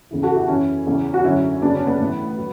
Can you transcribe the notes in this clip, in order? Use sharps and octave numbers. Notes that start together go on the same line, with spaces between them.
E2 C#3 E3
F#4 A4
E4 G4
F#2 E3 C#4 E4
E2 C#3 E3
F#4
F#2 D3 F#3 C#4 E4
F#2 C#3 F#3 B3 D4
C#4
B3
A2 E3
F#3